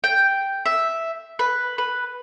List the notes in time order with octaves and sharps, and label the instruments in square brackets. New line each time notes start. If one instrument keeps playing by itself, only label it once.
[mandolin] G5
E5
B4
B4